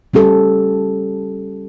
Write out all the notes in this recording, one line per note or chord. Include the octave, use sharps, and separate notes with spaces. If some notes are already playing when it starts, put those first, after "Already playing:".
G3 C#4 G4 A4